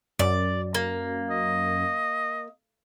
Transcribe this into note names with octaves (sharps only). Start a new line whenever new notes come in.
F#2 D5
A#3
D#5